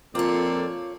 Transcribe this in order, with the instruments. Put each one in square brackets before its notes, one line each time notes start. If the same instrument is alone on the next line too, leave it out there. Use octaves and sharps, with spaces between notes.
[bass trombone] F2 [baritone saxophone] A#3 [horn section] C4 A4 D5 [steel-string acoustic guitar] F4 C#5